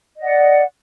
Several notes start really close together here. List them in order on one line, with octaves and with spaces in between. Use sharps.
D#5 D5 F#5